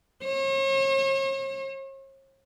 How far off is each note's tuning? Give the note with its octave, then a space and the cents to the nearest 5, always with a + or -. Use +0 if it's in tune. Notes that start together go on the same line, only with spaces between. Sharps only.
C#5 -45